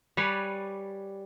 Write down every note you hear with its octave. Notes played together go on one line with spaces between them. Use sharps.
G3 B4 C#5 D5 G#5